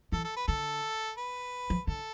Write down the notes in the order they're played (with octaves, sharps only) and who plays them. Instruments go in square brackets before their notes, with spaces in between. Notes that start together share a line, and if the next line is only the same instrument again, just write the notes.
[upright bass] E3 [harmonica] A4
[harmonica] A4
B4
[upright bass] D3 [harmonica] A4
[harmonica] B4
[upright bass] F3
[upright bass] D3 [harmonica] A4